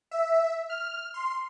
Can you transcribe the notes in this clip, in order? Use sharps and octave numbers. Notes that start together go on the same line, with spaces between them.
E5
F6
C6